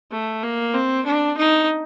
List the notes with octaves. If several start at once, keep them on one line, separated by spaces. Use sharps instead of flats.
A3
A#3
C4
D4
D#4